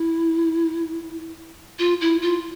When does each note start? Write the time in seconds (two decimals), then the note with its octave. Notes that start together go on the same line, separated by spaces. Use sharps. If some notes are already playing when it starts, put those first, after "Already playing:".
Already playing: E4
1.79 F4
2.01 E4
2.22 F4